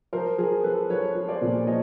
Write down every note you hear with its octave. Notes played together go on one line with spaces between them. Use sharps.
F3 A#4 C5
F3 G#4 A#4
F3 A4 B4
F3 B4 C#5
F3
C5 D5
A#2
F3 C#5 D#5